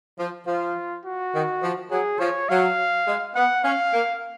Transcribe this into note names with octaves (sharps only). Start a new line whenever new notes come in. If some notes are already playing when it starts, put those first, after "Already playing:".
F3
F3 F4
F#4
D#3
F3
F#3 G#4
F3 C#5
F#3 F5
G#3
B3 F#5
C#4 F5
A#3